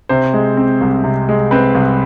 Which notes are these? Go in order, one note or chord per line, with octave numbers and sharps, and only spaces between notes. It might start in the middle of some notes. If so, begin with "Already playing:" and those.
C3 C5
G#3
C4
C2
C3
G#3
C4 B4
C2